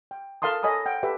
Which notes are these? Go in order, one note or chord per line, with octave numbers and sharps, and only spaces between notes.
G5
A4 A#4 F5 A5 C6 D#6
A4 C#5 D#5 G#5 B5 D#6
F#5 G5
G4 A4 B4 E5